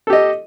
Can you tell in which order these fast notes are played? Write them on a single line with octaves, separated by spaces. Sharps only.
A4 G4 D#5